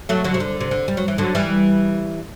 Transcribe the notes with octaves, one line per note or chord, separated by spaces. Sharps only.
F#3 A3
D3 F#3
C3
D3
C3
D3
G3
F#3
E3
D3 F#3
E3 G3